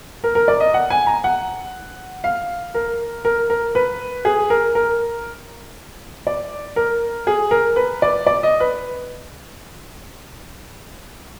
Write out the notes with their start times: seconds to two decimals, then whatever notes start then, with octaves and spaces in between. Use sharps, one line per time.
0.24 A#4
0.35 A#4
0.48 D5
0.60 D#5
0.74 F#5
0.90 G#5
1.07 A#5
1.24 F#5
2.24 F5
2.75 A#4
3.25 A#4
3.50 A#4
3.75 B4
4.25 G#4
4.50 A#4
4.75 A#4
6.27 D5
6.76 A#4
7.27 G#4
7.51 A#4
7.76 B4
8.02 D5
8.27 D5
8.43 D#5
8.60 B4